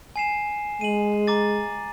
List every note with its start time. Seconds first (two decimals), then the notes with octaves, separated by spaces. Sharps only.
0.16 G#5 C7 E7
0.81 G#3 D#7 F#7
1.27 A#5 D6 A6